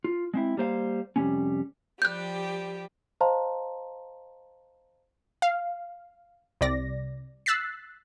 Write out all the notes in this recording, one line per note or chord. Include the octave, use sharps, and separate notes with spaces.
F4
G#3 C4 E4
G3 A#3 C5 D5 F5
F2 C3 G3 G#3 C4 C#4
F3 G3 G4 F#6 G6
C5 D#5 F5 A5 A#5 C6
F5
C2 C3 D5 A#6
E6 F#6 A6 B6 C7